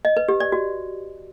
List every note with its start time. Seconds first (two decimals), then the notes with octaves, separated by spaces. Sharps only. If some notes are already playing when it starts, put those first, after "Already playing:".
0.05 D#5
0.17 B4
0.29 G4
0.40 D5
0.52 F#4